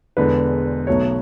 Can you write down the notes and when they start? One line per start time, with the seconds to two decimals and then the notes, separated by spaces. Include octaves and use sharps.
0.17 E1 E2 D3 G#3 B4
0.87 B1 B2 F#3 A3 C#5